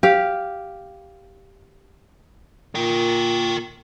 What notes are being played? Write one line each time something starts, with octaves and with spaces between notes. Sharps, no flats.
G4 F5
A#2 A#4 G5